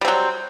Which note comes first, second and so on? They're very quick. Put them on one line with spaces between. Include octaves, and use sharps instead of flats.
G3 C4 F#3